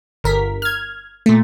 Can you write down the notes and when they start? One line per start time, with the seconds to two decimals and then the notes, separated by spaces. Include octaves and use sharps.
0.24 G1 A#4 B6
0.62 F6 G#6
1.26 A#2 A3